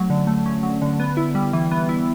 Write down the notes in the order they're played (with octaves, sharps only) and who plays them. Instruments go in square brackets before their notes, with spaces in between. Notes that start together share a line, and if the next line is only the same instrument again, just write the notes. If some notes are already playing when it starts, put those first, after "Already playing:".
Already playing: [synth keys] F#3 A3 C#4
D3
A3
C#4
F#3
D3
B3
E4
G3
E3
B3
E4